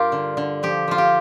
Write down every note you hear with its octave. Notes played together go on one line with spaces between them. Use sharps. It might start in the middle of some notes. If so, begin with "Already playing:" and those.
Already playing: G2 F4 G4 A#4
D3
D3
F3 G4
F3 F4
G4